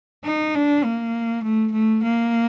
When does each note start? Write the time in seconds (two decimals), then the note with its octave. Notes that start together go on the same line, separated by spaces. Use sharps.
0.25 D#4
0.55 D4
0.84 A#3
1.43 A3
1.72 A3
2.03 A#3